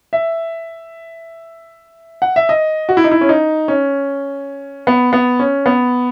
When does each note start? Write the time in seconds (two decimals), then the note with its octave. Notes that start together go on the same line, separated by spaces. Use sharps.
0.13 E5
2.22 F#5
2.36 E5
2.49 D#5
2.89 F#4
2.97 E4
3.04 D#4
3.11 E4
3.21 C#4
3.29 D#4
3.68 C#4
4.87 B3
5.13 B3
5.39 C#4
5.66 B3